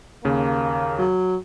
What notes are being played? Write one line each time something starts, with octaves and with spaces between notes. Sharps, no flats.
D#2 C#3 A#3
F#3